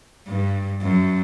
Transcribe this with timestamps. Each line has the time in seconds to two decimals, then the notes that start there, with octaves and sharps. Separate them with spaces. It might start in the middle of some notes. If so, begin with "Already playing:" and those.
0.27 G2
0.82 F#2